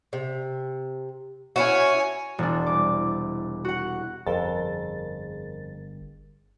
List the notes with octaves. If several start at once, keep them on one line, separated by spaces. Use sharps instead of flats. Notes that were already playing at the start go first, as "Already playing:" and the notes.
C3
C#4 E4 F#4 C#5 G#5
E1 D4
C2 D6
F#4 F#5
G1 F2 G#4 A#4 A6